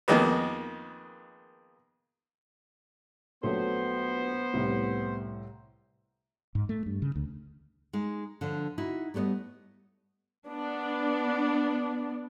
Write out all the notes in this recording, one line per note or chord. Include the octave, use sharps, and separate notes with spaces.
F2 D#3 G#3 A#3 B3
A#1 F#3 A3 B3 C5
C2 A2
G#2
A3
G2
C#3
D2
G#3 D#4
D3 F3 D4
D#4 E4 F#4
G3 A3 B3 C5 D#5
B3 D4